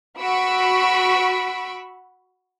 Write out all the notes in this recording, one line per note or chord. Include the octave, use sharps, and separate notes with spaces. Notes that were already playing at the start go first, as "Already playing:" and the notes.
F#4 B5 C#6 E6 B6 D7